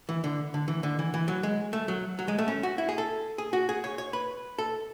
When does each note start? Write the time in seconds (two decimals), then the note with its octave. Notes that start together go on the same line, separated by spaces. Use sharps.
0.09 E3
0.24 D3
0.54 D3
0.68 E3
0.83 D3
0.99 E3
1.14 E3
1.28 F#3
1.43 G#3
1.73 A3
1.88 F#3
2.19 F#3
2.28 G#3
2.38 A3
2.48 C#4
2.63 F#4
2.78 E4
2.89 G#4
2.98 A4
3.38 G#4
3.53 F#4
3.69 G#4
3.84 C#5
3.98 C#5
4.13 B4
4.58 A4